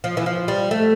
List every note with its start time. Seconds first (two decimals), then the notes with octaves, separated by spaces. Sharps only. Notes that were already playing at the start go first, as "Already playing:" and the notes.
0.04 F3
0.17 E3
0.26 F3
0.48 G3
0.71 A3